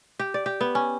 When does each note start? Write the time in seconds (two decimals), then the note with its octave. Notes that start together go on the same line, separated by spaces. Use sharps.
0.19 G4
0.34 D5
0.46 G4
0.61 B3
0.75 C#4